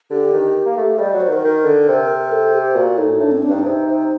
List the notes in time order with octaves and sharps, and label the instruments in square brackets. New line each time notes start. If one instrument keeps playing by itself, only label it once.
[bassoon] D3 [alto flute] G4
[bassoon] D#3
A#3
A3
[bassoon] G3 [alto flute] D#5
[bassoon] F#3 [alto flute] D5
[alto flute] C5
[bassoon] D#3 [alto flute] A#4
[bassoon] D#3
D3
C3
[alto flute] A4
G4
[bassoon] A#2 [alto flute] F#4
[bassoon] A2 [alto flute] D#4
[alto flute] D#4
[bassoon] A2 [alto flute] D4
[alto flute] C4
D4
[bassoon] G2 [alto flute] D#4
[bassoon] C3 [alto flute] D#4
[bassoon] C3